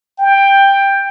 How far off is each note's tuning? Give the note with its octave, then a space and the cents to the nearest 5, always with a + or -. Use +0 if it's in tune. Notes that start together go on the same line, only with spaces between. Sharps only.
G5 +10